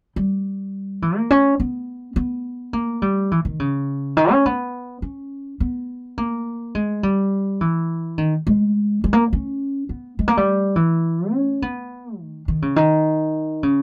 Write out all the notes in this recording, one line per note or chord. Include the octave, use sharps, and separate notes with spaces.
G3
E3
A#3
C#4
B3
B3
A#3
G3
E3
D#3
C#3
D#3
C#4
B3
C#4
B3
A#3
G#3
G3
E3
D#3
G#3
G#3
A#3
C#4
B3
G#3
A#3
G3
E3
C#4
B3
D#3
D#3
C#3
D#3
C#3